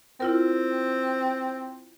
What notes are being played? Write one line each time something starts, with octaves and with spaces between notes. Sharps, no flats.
C4 E4 F4 A#4